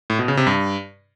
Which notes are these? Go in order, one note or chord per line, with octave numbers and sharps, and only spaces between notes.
A2
B2
C#3
C3
G2